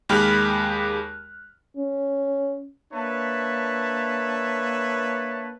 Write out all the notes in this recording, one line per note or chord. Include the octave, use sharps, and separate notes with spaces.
D#2 G#3 G4 B5 F6 F#6
C#4
A#3 D4 B4 C#5 E5 A5